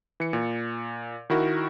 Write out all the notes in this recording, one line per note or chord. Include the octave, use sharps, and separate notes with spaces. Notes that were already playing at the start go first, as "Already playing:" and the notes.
E3 C#7
A#2
D#3 E4 F#4 A#4